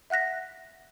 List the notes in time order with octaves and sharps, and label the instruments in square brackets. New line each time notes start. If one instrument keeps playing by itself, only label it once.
[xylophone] E5 F#5 F#6 A#6 B6